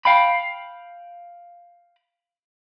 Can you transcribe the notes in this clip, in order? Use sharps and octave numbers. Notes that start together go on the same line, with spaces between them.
F5 G5 B5